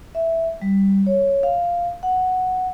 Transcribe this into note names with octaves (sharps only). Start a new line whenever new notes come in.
E5
G3
C#5
F5
F#5